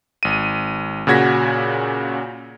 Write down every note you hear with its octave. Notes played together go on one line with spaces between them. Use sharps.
G#1 D#7
A#2 C#3 F#4 G#6 A#6 B6